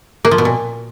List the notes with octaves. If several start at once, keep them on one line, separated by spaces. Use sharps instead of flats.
A#3
F3
B2
A#2